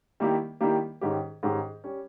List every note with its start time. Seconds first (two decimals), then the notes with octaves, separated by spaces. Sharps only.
0.20 D#3 G3 A#3 E4 G4
0.61 D#3 G3 A#3 E4 G4
1.01 G#2 D#3 G#3 C#4 G4
1.43 G#2 D#3 G#3 C#4 G4
1.84 G3 C#4